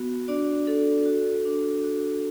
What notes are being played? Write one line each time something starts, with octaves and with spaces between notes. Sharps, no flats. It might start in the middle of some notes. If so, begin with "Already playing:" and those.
Already playing: B3 F#4
D4 F#4 D5
D4 A4
F#4
D4
F#4